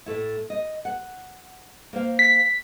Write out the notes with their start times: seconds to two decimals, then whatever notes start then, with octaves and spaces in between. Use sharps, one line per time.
0.06 A2 A3 E4
0.50 D#5
0.85 F#5
1.93 A#3 C5 F5
2.19 B6